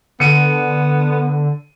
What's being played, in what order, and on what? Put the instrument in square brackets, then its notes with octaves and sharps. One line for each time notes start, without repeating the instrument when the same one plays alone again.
[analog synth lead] D3 [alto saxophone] B3 [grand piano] C#7 D#7